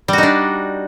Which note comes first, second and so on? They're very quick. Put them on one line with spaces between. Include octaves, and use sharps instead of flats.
G3 F#4 D#4 D4